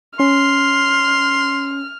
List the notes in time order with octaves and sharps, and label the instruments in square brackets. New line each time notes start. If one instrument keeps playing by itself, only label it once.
[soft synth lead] C#4 [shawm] C6 [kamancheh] F6